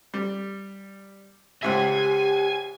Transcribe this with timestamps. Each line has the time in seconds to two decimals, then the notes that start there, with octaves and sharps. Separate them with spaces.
0.14 G3
1.63 C#2 G#2 G4 E5 G#5